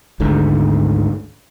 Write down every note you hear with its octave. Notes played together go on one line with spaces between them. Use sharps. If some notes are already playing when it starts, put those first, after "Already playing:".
G#1 D2 G#2 D3